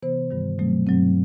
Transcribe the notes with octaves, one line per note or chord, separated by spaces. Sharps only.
C3 E3 B3 C5
G2 D#3 G3
B2 F#3 A3 C4
G2 F#3 C4